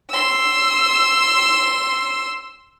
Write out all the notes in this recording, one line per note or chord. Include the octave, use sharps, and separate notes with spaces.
C6 E6